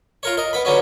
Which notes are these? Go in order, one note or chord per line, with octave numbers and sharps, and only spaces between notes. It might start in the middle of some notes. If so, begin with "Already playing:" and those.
F4 A#4 C#5
A#4 D#5
B3 B5
D3 F#3 B3 C#4